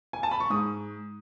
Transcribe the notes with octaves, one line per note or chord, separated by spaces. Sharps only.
G#5
A5
B5
C#6
G#2 D#6